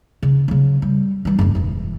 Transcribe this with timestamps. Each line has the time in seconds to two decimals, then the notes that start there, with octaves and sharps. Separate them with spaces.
0.22 C#3
0.48 C#3 F#3
0.82 G3
1.25 E3 G3
1.39 F#1 G#2
1.55 E1 E3